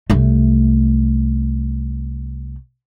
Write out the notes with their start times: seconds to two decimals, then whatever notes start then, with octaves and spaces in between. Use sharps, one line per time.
0.10 C2 A3